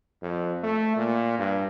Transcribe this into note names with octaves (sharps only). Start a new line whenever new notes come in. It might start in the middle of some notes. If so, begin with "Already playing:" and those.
F2
A3
A#2
G2